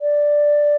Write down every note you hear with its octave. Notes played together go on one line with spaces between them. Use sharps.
D5